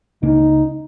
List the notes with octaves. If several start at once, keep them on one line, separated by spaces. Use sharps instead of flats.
C#2 C#3 A#3 D#4